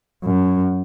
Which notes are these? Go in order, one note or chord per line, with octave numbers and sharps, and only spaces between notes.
F#2